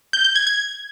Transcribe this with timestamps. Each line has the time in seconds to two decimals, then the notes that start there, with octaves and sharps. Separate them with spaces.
0.13 G6
0.24 G6
0.36 G#6
0.47 G#6